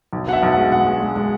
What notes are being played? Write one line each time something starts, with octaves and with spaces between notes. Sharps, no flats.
B1
B2 F#5
E5
B1
G#3 F#5
B1 F#5
G#3
G#3
G#3